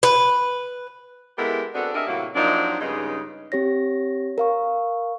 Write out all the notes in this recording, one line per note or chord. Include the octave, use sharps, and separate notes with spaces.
B4
G#3 B3 E4 G4 A4 A#4
B3 C4 D4 F#4 G#4 A4
D4 G4 G#4 A#4 D#5 E5
A2 C3 F#3 A#3
F3 F#3 A#3 C4 D4 D#4
G2 C#3 G#3 B3 D#4
C4 G4 C#5 A#6
A#4 F5 C#6